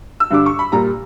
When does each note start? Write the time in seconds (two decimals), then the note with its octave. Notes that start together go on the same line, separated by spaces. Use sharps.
0.20 E6
0.31 G2 D3 G3 D6
0.46 C#6
0.59 B5
0.72 A#2 G3 A#5